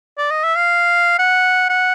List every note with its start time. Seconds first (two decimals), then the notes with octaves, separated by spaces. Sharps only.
0.18 D5
0.31 D#5
0.44 E5
0.56 F5
1.19 F#5
1.69 F#5